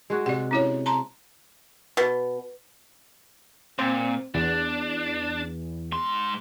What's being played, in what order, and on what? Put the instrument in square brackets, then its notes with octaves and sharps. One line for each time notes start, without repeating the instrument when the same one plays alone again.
[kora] G#3 F#4 G#4
[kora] C3 [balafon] D5 F#5
[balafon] C#4 E4 C#5
A5 A#5 C6
[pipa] B2
[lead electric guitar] A#2 [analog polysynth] C4
[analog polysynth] E2 [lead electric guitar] D4
[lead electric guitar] G#2 C6